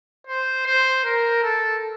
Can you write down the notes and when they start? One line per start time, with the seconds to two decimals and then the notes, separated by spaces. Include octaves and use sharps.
0.27 C5
0.66 C5
1.04 A#4
1.43 A4